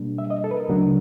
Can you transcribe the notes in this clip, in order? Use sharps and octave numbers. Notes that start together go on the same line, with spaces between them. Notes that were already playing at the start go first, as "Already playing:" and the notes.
Already playing: B2 G3 A#3 D4
E5
D#5
A4
B4
A#4
D2 C#3 F#3 A3 D4